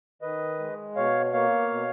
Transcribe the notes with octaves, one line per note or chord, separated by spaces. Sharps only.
D#3 B4 D#5
G#3
B2 C#5 F5
A#3 C#5 F5
B2